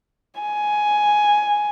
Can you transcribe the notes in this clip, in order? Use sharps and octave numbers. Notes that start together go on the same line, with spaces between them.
G#5